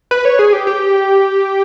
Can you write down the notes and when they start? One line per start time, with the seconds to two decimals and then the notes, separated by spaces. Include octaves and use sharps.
0.11 B4
0.25 C#5
0.39 G#4
0.53 G4
0.67 G4